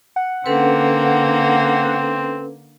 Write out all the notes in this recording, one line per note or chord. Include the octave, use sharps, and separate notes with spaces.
F#5
D3 A#3 C4 C#4 A4 B4